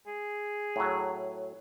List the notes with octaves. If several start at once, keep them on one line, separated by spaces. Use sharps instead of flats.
G#4
A2 F#3